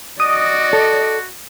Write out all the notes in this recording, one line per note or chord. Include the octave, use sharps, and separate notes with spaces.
F#4 D5 D#5 D#6
A4